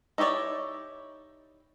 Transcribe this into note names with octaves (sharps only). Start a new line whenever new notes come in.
D#4 E4 G4 C#5 D5